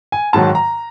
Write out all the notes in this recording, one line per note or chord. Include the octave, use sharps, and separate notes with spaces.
G#5
G#2 D#3 F#3 A5
A#5